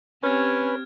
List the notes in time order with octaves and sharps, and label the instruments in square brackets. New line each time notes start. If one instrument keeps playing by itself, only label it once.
[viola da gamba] C4 G4 [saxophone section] C#4 [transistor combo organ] B4 [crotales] F6 G#6